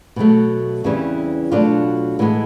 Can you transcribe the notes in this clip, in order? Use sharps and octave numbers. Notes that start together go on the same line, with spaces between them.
B2 F#3 A3
E2 C#3 E3 G3 C4
B2 F#3 A3 D4 F4
A2 E3 G#3 B3